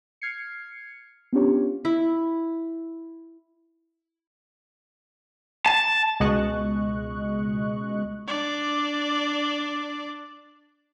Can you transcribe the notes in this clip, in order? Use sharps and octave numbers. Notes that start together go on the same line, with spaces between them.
F6 G#6 C7 C#7
B3 C#4 D4 F4 G4 C#5
E4
A5
C#2 B2 G#3 D#5 C#6 F#6
D4 D5